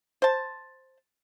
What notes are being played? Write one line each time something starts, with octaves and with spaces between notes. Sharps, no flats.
C5 A5